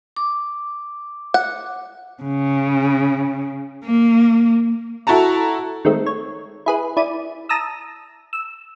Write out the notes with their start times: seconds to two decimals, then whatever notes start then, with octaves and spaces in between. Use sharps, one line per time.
0.16 D6
1.34 F#5
2.23 C#3
3.85 A#3
5.07 E4 F#4 A4 A5 A#5
5.85 D#3 G#3 A3 C4
6.06 C#5
6.66 E4 G#4 B4
6.97 E4 D5 D#7
7.49 A5 A#5 D#6 E6
8.33 E6